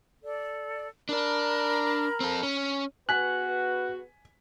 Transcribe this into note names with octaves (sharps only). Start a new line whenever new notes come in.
A4 D5
D4 A#4 D5 A#5 B5
C4 A4
C#4
B3 F#4 G#4 B4 G#5 F#6 B6